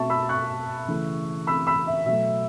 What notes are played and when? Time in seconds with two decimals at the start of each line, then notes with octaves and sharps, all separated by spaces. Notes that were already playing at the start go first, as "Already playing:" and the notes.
Already playing: B2 A3 E5 A5 C#6
0.10 B5 E6
0.29 C#6 F#6
0.88 C#3 E3 A3
1.47 B5 E6
1.67 B5 E6
1.87 E5
2.06 B2 F#3 A3 E5